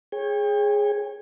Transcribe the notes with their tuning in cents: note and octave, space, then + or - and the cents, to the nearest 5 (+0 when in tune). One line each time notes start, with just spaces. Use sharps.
G#4 +0 C#5 -20 G5 +35